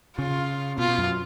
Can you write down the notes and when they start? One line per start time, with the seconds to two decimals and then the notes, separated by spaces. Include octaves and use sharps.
0.18 C#3 F4
0.78 B2 F4
0.89 B2
0.99 F#2